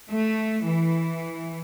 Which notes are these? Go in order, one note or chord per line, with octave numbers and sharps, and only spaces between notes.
A3
E3